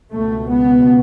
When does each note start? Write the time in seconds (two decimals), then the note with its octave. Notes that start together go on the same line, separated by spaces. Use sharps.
0.11 C#2 B2 A3
0.50 B3